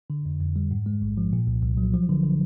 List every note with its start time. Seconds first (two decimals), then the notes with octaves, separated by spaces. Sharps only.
0.10 D3
0.26 F2
0.40 F2
0.56 G3
0.71 G#2
0.86 G#3
1.02 A1
1.17 F3
1.33 A#2
1.47 C2
1.63 C2
1.77 F#3
1.93 F3
2.09 D3
2.24 D3